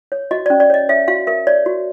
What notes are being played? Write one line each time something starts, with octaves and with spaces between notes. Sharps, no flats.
C#5
F#4 D#5
C#4 D5
D5
C#5 D#5
C#5 E5
F#4 F5
A#4 E5
C#5 D5
F#4